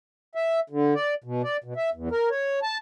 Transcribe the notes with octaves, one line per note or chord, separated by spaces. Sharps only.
E5
D3
D5
B2
D5
B2
E5
E2
A#4
C#5
A5